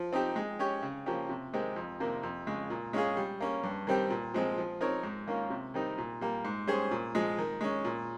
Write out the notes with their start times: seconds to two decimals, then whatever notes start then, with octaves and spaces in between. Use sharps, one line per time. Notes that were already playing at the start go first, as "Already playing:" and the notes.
Already playing: F3
0.13 C4 D#4 G4
0.36 G#3
0.59 C#4 G4 C#5
0.82 C#3
1.06 F3 A#3 C#4 G4
1.29 C3
1.54 D#3 G#3 C4 G4
1.76 F2
2.00 C3 D#3 A#3
2.23 F2
2.47 C#3 G#3
2.70 A#2
2.93 G#3 C#4 F4 G#4
3.17 G3
3.41 A#3 C#4
3.63 G2
3.87 D#3 G3 C4 G4
4.10 A#2
4.34 F3 G#3 C4
4.58 F3
4.81 C4 D#4 A#4 C#5
5.03 G#2
5.27 D#3 A#3 C#4 F4
5.50 C3
5.74 D#3 G3 C4 D#4
5.98 A#2
6.21 G3 A#3
6.45 G#2
6.67 G3 C#4 G#4 C5
6.91 A#2
7.15 F3 G#3
7.38 D#3
7.61 G#3 C#4
7.85 A#2